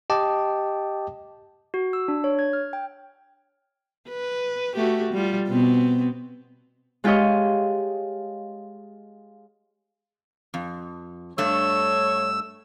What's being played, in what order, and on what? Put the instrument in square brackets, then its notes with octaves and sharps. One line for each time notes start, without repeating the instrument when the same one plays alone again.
[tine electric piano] G4 D#5 G5 A5 D6
[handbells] F#4
E6
D4
C#5
G#6
F6
G5
[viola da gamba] B4
A3 F#4 G4
G3 F4
B2 B3 C4
[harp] G#3 F4 G4 C#5 D#5
[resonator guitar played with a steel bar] F2
[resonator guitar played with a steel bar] G2 A3 [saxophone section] C#5 [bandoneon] E6